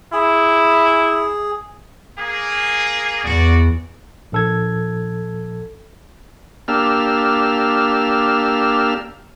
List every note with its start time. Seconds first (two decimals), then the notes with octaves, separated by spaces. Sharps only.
0.13 E4 G#4
2.19 A#3 G#4
3.25 E2 F#4 D5
4.32 A#1 A4 G#6
6.68 A#3 D4 G4 E6 F6